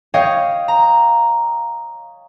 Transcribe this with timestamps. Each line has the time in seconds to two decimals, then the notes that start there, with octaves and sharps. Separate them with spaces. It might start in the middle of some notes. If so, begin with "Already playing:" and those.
0.14 C#5 D#5 F5 G5
0.68 A#5